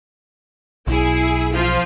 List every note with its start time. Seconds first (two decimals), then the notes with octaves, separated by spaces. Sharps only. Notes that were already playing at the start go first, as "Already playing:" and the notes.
0.87 B1 E4 G#4
1.52 F3 F4